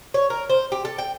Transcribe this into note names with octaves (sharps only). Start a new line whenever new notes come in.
C#5
A#4
C5
G4
A4
G5